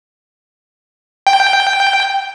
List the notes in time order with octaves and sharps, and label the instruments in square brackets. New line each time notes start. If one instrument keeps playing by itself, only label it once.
[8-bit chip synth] G5